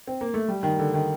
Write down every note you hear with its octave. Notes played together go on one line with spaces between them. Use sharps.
C4
A#3
A3
G3
D#3
D3
D#3